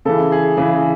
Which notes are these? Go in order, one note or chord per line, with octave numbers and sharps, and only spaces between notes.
C#3 E3 A4
G#4
C#3 E3 G#4